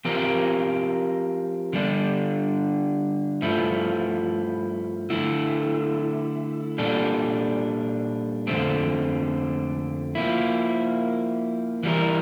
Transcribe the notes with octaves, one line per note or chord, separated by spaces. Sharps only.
F3 C4 G4 A#4
D3 G3 D4
G2 F3 A3 E4
D3 A3 E4
A#2 G3 D4 A4
F2 D3 F3 A3 C4
F3 A#3 E4
E3 G3 A#3 E4 A#4